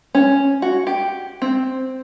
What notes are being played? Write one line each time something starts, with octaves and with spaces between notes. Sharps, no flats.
C#4
F#4
G4
C4